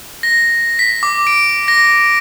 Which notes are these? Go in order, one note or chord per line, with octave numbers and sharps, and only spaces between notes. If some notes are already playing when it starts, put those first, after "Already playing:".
A#6
B6
D6
D7
A#6